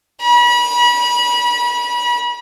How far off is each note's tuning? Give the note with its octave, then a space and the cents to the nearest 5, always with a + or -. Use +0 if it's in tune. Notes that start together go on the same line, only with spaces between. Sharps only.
B5 -35